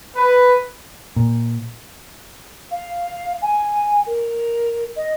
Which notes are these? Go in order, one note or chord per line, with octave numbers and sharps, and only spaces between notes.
B4
A#2
F5
G#5
A#4
D#5